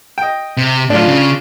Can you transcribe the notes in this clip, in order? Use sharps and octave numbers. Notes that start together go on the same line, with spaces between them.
D#5 G5
C3
A2 F#3 D4 F4
C#3